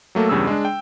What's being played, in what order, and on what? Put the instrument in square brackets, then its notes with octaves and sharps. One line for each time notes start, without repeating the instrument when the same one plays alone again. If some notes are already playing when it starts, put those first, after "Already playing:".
[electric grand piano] F#3 A3 A#3 A4
E2 G2 C#3 G3 G#4 E6
G#3 D4
G5